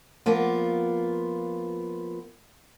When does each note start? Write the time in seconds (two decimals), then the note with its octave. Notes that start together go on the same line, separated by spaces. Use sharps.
0.26 F3 A#3 B3 F4